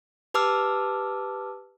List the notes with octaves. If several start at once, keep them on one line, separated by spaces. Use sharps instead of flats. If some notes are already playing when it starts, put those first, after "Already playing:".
G4 B4 A5 D6 E6 F6